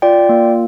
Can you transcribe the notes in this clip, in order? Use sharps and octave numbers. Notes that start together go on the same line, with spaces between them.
F4 D5 G5
A#3